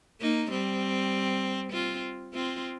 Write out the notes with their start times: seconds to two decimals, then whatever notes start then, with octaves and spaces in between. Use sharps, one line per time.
0.21 A#3 D#4
0.51 G3 C4
1.72 C4 F4
2.34 C4 F4